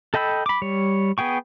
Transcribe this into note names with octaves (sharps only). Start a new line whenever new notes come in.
A4 D#5 G5 B5 E6
B5 D6
G3 C#5
B3 G#4 G5 C#6